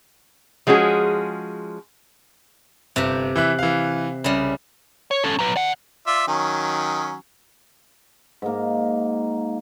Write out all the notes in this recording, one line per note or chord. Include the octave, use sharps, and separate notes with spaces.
F3 G#3 C#4 F#4 G#4
G1 C3 G4
E3 E5 F#6
E3 F5
C2 C#3 G3
C#5
C#4 A4
F#3 B4
D5 F#5
F4 D5 E5
D#3 F#3 C#4
G#2 A#3